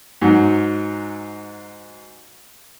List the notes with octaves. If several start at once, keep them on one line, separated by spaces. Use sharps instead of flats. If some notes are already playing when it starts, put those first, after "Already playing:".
G#2 F#3